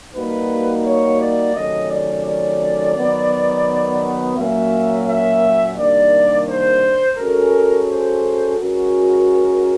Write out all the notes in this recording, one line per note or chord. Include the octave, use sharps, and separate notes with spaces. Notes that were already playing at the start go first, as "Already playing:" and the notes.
G3 A#3 D#4 F#4 B4
C#5
D5
C3 D#3 F#3 A3 C#4 D#5
D5
D5
D#3 F#3 B3
A#2 F#3 A#3 C#4 F#4 E5
E5
C3 D#3 G3 A#3 D4 D5
C5
G#3 C#4 F#4 A4 A#4
C5
G#3 C#4 F#4 A#4